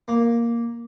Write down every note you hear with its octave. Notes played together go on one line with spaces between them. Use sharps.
A#3